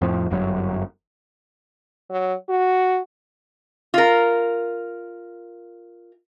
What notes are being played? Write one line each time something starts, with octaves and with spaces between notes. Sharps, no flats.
F2 A2 F3
G1 F#2 A#2 F#3
F#3
F#4
F4 A#4